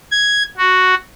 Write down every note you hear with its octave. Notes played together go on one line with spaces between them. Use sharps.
G#6
F#4